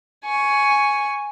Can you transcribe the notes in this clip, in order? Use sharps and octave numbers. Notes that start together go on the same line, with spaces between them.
G#5 C#6